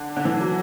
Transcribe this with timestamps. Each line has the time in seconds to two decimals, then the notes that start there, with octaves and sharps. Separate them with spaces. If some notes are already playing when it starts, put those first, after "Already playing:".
Already playing: D3
0.17 D3
0.25 E3
0.40 F#3